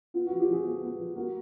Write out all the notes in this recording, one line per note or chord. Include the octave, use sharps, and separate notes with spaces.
B3 F4
F3 F#4
F4 G4
F3 F#4 G#4
B3
B3
F3
A#3 F#4